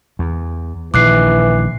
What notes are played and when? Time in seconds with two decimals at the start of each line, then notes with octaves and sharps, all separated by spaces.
0.19 E2
0.94 A#1 D#3 E3 D6 F#6 C7